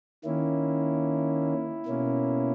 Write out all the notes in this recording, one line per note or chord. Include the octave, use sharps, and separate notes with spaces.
D#3 A#3 C#4 E4
B2 A#3 C#4